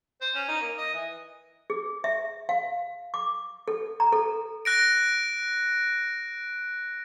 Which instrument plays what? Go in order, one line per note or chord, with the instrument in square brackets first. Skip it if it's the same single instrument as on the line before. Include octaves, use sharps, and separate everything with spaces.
[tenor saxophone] C5
C#4
D#4
A#3
D#5
E3
[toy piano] G#4
E5
F5
D6
A4
A#5
A4
[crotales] F#6 A#6 D7